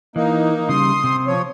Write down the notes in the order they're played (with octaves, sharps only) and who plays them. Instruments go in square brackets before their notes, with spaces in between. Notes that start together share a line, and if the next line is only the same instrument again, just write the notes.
[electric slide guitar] E3 [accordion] A#3 D#4
[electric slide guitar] C#3 G3 [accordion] C6 D#6
[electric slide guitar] C3
[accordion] F3 C#5